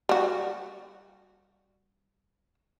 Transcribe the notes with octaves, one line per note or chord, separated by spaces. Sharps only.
G3 F#4